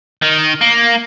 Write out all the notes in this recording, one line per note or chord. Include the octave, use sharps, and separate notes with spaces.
D#3
A#3